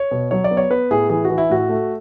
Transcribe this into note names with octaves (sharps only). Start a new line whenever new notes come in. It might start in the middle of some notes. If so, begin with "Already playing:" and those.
Already playing: C#5
B2
F#3 C#5
D5
B3
C#5
B3 B4
A2 G#4
E3 G#4
F#4
E3
E4
A2 F#4
A3